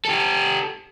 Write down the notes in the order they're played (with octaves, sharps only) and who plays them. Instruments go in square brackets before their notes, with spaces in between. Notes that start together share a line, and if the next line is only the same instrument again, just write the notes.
[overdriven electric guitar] G4 A4